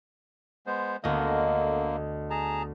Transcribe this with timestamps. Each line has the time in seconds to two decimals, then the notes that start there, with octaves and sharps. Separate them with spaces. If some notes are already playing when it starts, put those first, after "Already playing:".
0.67 G#3 B3 C5
1.04 D2 D3 A#3 B3 D#5
2.30 G#4 A5 A#5